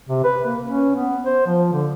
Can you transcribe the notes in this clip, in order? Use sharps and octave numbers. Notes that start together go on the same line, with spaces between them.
C3
B4
A#3
C#4
B3
C5
F3
D3